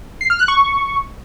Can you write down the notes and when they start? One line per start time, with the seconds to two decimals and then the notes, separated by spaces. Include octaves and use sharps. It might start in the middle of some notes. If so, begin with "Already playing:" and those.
0.21 C7
0.30 F6
0.39 F#6
0.48 C#6